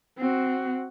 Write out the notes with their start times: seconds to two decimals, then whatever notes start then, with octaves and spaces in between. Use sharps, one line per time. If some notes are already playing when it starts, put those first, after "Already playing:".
0.18 C4 F#4